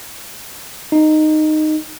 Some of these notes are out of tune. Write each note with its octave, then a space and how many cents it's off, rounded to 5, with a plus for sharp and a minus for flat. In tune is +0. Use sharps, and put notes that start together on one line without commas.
D#4 -10